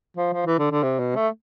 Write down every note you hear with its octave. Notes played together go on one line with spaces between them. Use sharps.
F3
F3
E3
D3
D3
C3
B2
A3